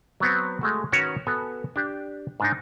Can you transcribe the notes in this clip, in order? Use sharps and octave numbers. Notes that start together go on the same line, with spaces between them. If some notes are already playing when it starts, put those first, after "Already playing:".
F#3 B3 C4
G#3 A3 F#4
D#3 C#4 F#4 B4 C#5
B3 F#4 A4 G#5
D4 G4
G#2 D4 D#4